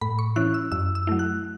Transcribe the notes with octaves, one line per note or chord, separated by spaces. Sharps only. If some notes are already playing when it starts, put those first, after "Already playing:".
A2 B5
C#6
E3 C#4 E4 F#6
E6
F#2 E6
E6
F#3 A3 E4
F#6